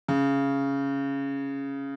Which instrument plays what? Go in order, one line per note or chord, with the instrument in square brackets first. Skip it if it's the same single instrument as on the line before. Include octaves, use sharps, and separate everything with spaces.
[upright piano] C#3